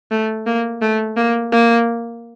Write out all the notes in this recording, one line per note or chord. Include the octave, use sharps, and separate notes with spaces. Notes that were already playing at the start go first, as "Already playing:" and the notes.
A3
A#3
A3
A#3
A#3